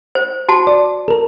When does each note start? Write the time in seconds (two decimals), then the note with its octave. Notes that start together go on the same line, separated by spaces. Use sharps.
0.15 C5
0.49 F#4 A5
0.67 D5
1.08 A4 A#4